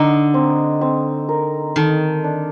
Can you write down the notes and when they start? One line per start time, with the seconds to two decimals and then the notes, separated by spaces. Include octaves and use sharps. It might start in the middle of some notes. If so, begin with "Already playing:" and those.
Already playing: D3 D#4
0.34 C4
0.81 C4
1.29 A#4
1.76 D#3 A4
2.24 D4